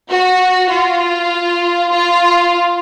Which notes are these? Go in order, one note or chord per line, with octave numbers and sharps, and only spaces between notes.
F#4
F4
F4